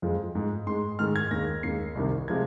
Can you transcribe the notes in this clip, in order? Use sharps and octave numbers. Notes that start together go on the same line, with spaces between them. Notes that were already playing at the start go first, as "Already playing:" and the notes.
F2 F3 G#3
G#2 G#3
G#2 G#3 C6
G#2 D#3 G#3 F6
G#6
D#2 D#3 G#3 A#6
D#2 D#3 G#3 C7
C2 C3 D#3
C3 F3 G#3 G#6